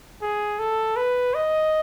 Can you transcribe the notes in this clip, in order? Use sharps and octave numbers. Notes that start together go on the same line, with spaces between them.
G#4
A4
B4
D#5